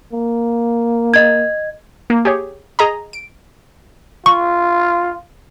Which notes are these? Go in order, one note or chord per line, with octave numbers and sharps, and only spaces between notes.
A#3
D#5 G#6
A#3
G4 G#4 C#5
G#4 D#5 A#5
D7
F4 C#6